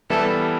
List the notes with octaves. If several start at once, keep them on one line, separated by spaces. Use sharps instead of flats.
E3 G3 B3 E4 A4